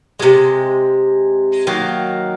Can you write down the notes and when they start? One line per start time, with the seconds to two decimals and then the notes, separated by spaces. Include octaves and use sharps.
0.19 C3 D#3 G#3
1.67 D#3 F#3 A#3